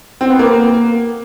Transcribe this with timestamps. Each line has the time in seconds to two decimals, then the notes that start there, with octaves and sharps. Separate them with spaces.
0.21 C4
0.30 B3
0.39 A#3